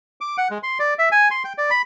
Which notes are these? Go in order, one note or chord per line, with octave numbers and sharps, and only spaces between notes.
D6
F#5
G#3
C6
D5
E5
G#5
C6
G5
D5
B5